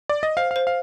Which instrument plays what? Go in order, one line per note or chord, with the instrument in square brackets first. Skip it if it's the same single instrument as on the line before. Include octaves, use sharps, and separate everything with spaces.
[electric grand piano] D5
D#5
[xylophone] C5 [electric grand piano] F5
[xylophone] C5 [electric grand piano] F5
[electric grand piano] F5